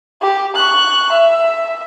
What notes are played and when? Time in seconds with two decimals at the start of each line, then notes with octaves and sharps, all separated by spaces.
0.22 G4
0.55 C#6 F#6
1.12 E5